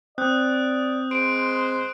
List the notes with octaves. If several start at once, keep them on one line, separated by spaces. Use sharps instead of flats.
C4 D5 D#6 F#6 G6
G#3 C5 D7